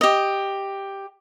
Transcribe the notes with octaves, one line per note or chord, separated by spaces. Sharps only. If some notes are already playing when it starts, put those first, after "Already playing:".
G4 D#5